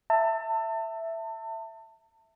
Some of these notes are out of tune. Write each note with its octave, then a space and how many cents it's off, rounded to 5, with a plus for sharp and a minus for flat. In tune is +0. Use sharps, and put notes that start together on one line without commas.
E5 +0 A5 +30